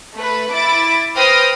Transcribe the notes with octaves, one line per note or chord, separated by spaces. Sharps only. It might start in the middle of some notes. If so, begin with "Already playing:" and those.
A3 B4
E4 D6 A6
B4 C5 G5 D#6 F6 A#6